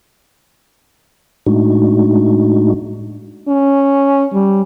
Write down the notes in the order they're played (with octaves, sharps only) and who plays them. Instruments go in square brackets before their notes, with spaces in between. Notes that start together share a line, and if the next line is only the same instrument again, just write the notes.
[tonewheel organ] A2 G#3 A3 D4 D#4 F#4
[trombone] C#4
G3